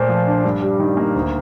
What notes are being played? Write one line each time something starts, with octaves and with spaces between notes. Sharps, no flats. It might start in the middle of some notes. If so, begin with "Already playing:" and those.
Already playing: A#2 A3 C5
F3
D4
G2
G3
D#3
A#3
D2